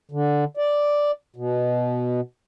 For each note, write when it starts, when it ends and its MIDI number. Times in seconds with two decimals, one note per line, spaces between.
0.12 0.44 50
0.57 1.11 74
1.36 2.21 47